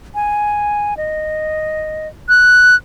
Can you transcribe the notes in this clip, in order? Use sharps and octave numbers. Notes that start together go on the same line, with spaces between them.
G#5
D#5
F#6